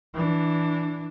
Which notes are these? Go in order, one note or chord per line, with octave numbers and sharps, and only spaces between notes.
E3 D4